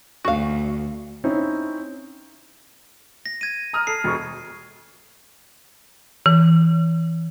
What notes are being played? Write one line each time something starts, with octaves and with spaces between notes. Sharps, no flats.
D2 F#4 F5
C4 C#4 D#4 E4
A#6
G#6 D#7
A#5 D#6 F6
A4 C7
E1 C#6
E3